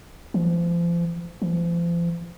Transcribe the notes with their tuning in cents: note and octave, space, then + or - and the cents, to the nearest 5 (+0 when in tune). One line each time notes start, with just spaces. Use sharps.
F3 -35
F3 -40